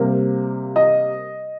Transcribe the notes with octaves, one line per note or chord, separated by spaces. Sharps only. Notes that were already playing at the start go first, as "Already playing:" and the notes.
Already playing: C3 G3 A#3
D#5